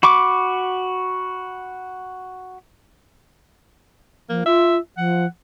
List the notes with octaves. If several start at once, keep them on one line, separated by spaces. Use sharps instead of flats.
F#4 B5 C#6 D6
F3 A#3
F4 E5
F3 F#5